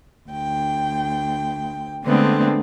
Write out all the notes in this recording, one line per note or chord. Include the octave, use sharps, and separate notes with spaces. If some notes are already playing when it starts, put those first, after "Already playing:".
D2 G5
D3 G#3 A3 B3 C4 D4